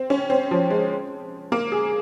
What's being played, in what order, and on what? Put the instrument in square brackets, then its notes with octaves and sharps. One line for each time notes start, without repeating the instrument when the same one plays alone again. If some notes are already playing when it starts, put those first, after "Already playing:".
Already playing: [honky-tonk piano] C4
C#4
C4
F3
G#3
A#3
G#4